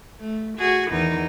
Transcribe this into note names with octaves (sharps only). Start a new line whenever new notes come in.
A3
F#4 G#4
E2 D#3 D#4